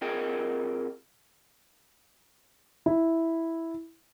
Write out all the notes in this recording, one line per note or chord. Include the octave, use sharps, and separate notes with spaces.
C3 F4 G#4 A#4 D#5 G5
E4